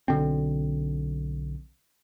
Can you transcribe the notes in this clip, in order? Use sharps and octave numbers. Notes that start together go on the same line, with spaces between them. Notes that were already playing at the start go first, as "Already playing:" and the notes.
B1 D3 C4